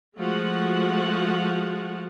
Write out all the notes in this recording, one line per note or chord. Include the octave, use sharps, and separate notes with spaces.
F3 G#3 A3 F#4 F#5